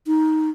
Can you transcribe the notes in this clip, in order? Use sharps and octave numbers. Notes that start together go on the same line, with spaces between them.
D#4